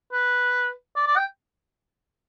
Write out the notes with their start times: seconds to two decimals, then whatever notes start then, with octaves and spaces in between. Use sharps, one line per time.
0.13 B4
0.96 D5
1.07 D5
1.17 G5